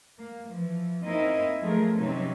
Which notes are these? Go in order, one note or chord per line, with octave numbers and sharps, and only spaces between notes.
A#3
E3 F3
A#3 C4 D#4 E4 A#4 D#5
F3 F#3 A3 G#4 A#4
C3 E3 F#3 C4 C#4 D#4